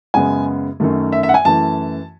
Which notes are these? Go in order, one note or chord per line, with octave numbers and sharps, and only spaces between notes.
F#2 C#3 G#3 B3 G#5
F#2 D#3 A3
E5
E5
F#5
G#5
F#2 E3 A3 A5